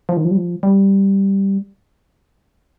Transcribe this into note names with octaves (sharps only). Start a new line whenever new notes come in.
F3
D#3
F3
G3
F3
G3